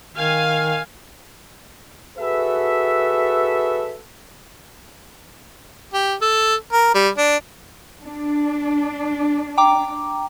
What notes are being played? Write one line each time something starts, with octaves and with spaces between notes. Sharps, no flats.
D#3 F5 G#5
F#4 G#4 A4 B4 E5
G4
A4
A#4
G3
D4
D4
G5 A#5 D6